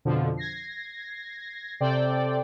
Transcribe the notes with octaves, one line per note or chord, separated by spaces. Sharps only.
F2 B2 D3 F3
G#6 A#6 C7
C3 A4 C5 D5 G5